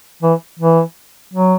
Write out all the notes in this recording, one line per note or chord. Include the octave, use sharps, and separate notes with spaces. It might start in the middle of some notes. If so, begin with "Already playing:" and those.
E3
E3
F#3